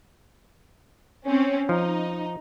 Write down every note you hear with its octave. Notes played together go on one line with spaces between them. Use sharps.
C4 C#4
F3 D#4